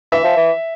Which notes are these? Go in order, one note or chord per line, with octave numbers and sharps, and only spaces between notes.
E3 E5
F3
E3